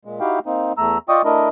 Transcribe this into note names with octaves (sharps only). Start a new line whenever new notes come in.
A#2 G#3
D#4 E4 F#4 G4 F5 G5
A#3 C4 D#4
E2 A3 A#5 E6
F4 D5 D#5 G5 C#6 D#6
A3 D4 E4 A#4 D#5